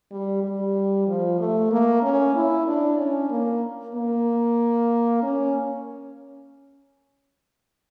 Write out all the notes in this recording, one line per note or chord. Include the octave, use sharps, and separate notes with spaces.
G3
G3
F3
A3
A#3
C#4
E4
D4
C#4
A#3
A#3
C#4